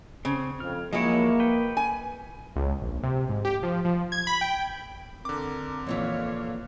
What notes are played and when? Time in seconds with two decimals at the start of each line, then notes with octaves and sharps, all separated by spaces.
0.25 C#3 C4
0.60 F2 F6
0.93 F3 F#3 G#3 A#3 E4 C#5
1.40 B4 G5
1.77 G#5
2.56 C#2
2.81 A#1
3.03 C3
3.29 G#2
3.45 G4
3.63 F3
3.85 F3
4.12 G#6
4.27 B5
4.41 G5
5.25 D3 C4 A#4 D6
5.87 F2 A#2 E3 C#5 F5